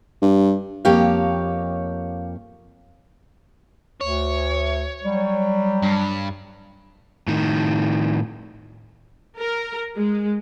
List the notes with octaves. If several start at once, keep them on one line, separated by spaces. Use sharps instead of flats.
G2
F2 A#3 G4 C#5 F5
D2 C#5
F#3 G3
G2
A2 D#3
A#4
G#3